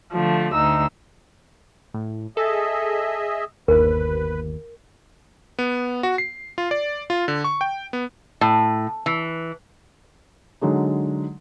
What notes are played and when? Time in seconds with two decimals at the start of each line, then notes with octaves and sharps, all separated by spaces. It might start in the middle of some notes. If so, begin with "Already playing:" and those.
0.12 D3 F3 A3
0.53 D2 D#4 E6
1.94 A2
2.37 G#4 A4 D#5 E5
3.68 G1 D#2 A#4 B4
5.59 B3
6.03 F#4
6.18 C7
6.58 F4
6.71 D5
7.10 F4
7.28 D3
7.44 C#6
7.61 G5
7.93 B3
8.41 A2
9.06 E3
10.61 D3 F#3 G#3 D#4